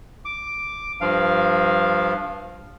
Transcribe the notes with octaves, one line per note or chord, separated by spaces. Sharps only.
D6
G2 F3 F5